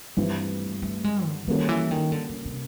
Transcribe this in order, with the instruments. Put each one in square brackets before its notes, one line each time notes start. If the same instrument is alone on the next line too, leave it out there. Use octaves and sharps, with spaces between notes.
[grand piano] G2 E3 G3 C4 E4 [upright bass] A3
[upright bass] A3
G#3
D3
[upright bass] D#3 [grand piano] G3 A#3 C#4 F#4 A4
[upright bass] E3
D#3
D3
D3
C3